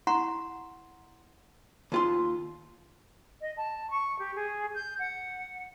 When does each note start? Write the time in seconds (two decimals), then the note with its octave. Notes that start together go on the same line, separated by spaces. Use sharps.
0.07 E4 F#5 A#5 C6 C#6
1.92 D#2 F4 C6
3.41 D#5
3.57 A5
3.90 C#6
4.19 G4
4.36 G#4
4.75 G6
4.99 F#5